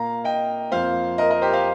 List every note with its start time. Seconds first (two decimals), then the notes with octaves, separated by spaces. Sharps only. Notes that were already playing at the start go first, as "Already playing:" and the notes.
Already playing: A#2 A#3 F5 A#5
0.24 D#5 G5
0.71 F2 F3 A#3 C5 F5
1.18 A#4 D#5
1.31 A#4 D#5
1.41 G4 C5
1.53 C5 F5